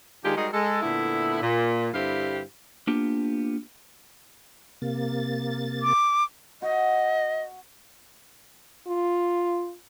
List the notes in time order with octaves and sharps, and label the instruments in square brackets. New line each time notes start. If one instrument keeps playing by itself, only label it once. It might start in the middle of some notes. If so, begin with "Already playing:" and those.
[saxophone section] D#3 G#3 D4 F4 G4
G3 G#3 D#4 F#4 G#4 A#4
G#3 A4
A#2 D3 A3 B3 E4
A#2
G2 D3 C4 E4 G4 F5
[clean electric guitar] A#3 B3 D4 F4 G4
[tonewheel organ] C3 A#3 A6
[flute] D6
[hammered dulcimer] F#4 [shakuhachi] D#5
[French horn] F4